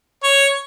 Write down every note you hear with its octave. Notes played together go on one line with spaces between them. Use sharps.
C#5